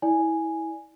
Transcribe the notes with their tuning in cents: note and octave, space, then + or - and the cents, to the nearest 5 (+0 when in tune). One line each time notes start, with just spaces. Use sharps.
E4 -20 D5 +0 G#5 +0